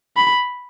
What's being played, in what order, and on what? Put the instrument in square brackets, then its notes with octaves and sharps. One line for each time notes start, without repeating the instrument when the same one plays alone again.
[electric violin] B5